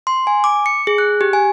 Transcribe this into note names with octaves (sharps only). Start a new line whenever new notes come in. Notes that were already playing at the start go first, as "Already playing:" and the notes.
C6
G#5
D6
C#7
G#4
F#6
G4
G#5